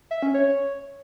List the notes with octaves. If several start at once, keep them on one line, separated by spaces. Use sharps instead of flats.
E5
C#4
C#5